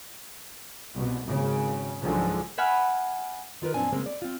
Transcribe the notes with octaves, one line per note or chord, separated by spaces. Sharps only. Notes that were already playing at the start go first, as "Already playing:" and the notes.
C2 B2
G#1 C#3
C#2 G#2 D3 F3 F#3 G#3
E5 F#5 G#5 B5 F6
D#3 F4 A#4 B4
F#2 A#2 C4 D4 G#5
C#3 G#3 A#3 C4
D5
C4 F4